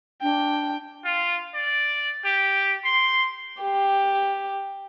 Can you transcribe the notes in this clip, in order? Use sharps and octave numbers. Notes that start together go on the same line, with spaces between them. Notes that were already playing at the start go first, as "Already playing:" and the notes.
D4 G5
F4
D5
G4
C6
G4